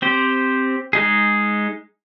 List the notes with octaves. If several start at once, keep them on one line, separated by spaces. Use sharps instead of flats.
C4 G4 C5
G#3 D#4 G#4